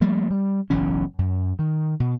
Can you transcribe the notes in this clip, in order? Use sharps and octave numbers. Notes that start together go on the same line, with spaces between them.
F3 G3 A3 A#3
G3
F#1 B1 E3 C#4
F#2
D#3
B2